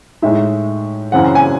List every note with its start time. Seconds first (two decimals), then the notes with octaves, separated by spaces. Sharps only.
0.22 A2 G#3 D#4 E5
1.12 F#2 C#3 E3 C4 F#5
1.35 G#5